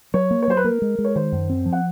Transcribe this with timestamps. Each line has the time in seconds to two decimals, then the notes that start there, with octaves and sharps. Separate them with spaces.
0.14 F#3 C#5
0.31 A#3
0.42 C#5
0.48 F#3 C5
0.57 B4
0.64 A#3 A#4
0.82 G#3
0.98 G#3
1.05 C#5
1.16 D#3 C5
1.32 F#2
1.50 C4
1.66 F3
1.73 F#5